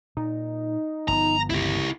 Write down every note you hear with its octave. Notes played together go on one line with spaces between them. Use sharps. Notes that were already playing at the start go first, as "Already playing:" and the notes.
A#2 D#4
G1 F3 B3 A#5
C#2 E4 G4